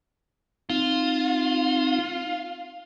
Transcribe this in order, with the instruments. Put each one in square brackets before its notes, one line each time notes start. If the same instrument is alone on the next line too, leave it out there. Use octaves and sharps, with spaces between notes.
[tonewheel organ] C4 D#4 [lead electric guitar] F4